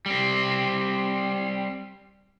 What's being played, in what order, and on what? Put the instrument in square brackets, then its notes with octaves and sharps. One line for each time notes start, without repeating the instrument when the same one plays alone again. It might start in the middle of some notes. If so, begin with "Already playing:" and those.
[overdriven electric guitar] G3 C4